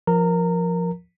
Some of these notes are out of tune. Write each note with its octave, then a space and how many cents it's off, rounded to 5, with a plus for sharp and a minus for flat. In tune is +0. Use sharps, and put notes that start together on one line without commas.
F3 +0 A#4 +5 A#5 -25